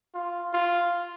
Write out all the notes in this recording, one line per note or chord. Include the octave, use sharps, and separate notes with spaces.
F4
F4